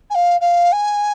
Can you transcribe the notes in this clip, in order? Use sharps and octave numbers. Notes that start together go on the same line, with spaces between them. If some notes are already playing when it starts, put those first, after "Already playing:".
G#5
F5
F5
G#5